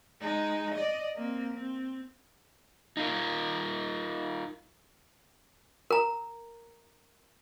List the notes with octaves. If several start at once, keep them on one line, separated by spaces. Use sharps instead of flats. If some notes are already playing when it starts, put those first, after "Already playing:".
G#3 D#4
D5 D#5
A#3 C4
C4
D#4 F4 A#4
A#4 A#5